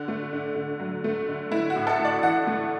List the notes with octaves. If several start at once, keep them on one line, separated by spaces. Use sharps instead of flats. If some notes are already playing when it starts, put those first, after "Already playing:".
Already playing: D3
A3
D3
D3
F#3
A3
D3
A3 E4
F#4
A2
A4
A2
D5
E3 F#5
A3